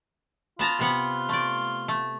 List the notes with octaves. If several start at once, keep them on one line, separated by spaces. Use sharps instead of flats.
B3 F4 A5 A#5
C3 B3 F#5
A3 D5
A3